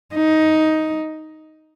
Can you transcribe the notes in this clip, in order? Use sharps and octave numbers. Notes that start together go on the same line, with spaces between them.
D#4